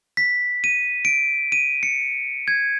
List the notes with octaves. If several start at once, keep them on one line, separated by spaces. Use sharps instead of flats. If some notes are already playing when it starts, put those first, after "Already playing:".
B6
D#7
D7
D#7
C#7
G#6